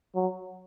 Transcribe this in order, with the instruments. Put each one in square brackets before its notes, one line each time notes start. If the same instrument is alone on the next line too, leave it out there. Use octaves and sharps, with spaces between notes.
[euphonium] F#3